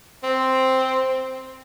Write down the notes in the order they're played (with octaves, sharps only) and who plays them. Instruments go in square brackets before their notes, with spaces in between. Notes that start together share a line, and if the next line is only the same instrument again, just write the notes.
[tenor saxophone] C4